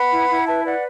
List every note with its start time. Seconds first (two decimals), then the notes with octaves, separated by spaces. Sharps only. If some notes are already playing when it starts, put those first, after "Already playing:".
Already playing: B4 F#5 B5
0.12 E4
0.29 E4
0.47 B4 E5 A5
0.65 B4 D5 F#5